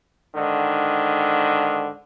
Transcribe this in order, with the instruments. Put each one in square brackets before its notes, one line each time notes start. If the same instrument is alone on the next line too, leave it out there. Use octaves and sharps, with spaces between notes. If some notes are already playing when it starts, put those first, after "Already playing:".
[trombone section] G#2 D3 D#3